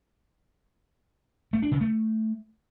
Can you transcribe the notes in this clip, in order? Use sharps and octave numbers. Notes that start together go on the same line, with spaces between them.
A3
D4
C#3
A3